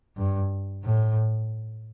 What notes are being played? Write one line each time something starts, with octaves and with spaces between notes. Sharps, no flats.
G2
A2